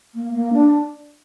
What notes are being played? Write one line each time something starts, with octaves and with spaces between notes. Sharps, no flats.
A#3
A#3
D4